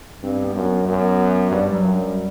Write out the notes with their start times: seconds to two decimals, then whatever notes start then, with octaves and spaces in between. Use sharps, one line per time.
0.23 G2 C4
0.39 C4
0.44 B3
0.55 F#2
0.66 B3
0.87 F#2 B3
1.51 G2 G3
1.66 G3
1.73 F#3
1.84 F#2
1.94 G3